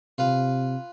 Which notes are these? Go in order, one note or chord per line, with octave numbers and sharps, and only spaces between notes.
C3 F4 B4 F5